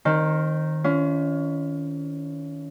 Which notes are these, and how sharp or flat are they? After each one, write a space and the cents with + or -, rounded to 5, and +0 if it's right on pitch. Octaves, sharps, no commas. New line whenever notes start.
D#3 +0 C4 +30
C#4 +25 F4 -35